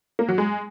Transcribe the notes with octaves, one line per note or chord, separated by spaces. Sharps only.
A#3
F#3
G#3